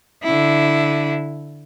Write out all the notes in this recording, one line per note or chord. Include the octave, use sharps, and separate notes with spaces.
D3 E4